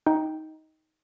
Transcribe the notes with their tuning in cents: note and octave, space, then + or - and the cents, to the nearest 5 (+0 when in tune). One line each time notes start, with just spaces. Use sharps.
D#4 +15 G5 +0